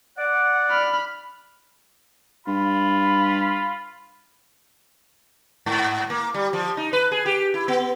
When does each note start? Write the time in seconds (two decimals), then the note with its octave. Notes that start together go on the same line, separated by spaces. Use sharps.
0.18 D5 F#5
0.70 B5 F6
2.47 G2 F4 B5
5.66 G#2
6.10 A#3
6.34 G3
6.53 F3
6.77 D#4
6.93 B4
7.12 G#4
7.26 G4
7.54 E4
7.68 B3